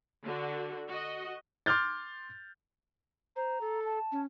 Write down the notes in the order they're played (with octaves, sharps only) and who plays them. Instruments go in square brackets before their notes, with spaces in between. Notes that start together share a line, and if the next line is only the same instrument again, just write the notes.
[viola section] D3 F#4
F#4 D#5
[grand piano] C6 D6 F6 G6 A6
[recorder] C5 [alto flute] A#5
[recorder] A4
[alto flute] A5
[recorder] C#4